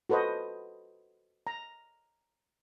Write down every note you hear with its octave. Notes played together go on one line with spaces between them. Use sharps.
F#4 A4 B4 C5 D#5
A#5